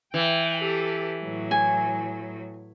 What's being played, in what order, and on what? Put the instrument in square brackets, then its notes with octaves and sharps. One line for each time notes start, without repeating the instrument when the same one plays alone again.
[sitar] E3 [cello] G5
[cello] G4 A4
A2 F#3
[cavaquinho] G#5